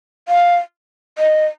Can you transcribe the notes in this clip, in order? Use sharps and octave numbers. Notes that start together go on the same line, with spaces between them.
F5
D#5